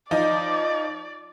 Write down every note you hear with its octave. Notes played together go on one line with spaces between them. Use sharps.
F3 D#4 D5